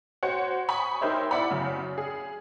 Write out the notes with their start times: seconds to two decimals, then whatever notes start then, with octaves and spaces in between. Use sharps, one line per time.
0.23 F#4 C5 C#5 F#5
0.69 G#5 B5 C#6 D#6
1.01 D#4 G4 A#4 C5 C#5 E5
1.31 E4 D5 F#5 B5
1.51 F#2 C#3
1.98 G#4